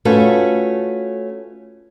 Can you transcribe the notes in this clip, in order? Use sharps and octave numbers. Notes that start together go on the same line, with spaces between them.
A3 C#4 F4 F#4 B4